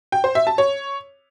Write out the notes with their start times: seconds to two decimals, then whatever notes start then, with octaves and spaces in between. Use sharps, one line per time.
0.12 G5
0.24 C5
0.35 E5
0.47 A5
0.58 C#5